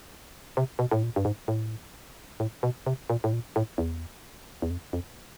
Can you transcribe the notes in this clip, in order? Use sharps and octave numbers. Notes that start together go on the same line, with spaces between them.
C3
B2
A2
A#2
G2
G#2
A2
A2
B2
C3
A#2
A2
A#2
A2
E2
E2
F2
F2